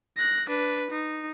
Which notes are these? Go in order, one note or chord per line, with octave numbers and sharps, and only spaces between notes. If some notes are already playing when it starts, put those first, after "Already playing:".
F#6 A#6
D4 B4
D#4